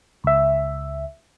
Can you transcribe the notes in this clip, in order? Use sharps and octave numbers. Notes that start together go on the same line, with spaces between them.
C#2 E5